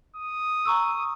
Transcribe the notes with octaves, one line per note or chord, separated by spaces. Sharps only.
D#6
A#5 C#6 E6